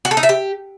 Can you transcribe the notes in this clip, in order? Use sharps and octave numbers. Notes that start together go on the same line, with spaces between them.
F#4
A4
D#4
E5
G4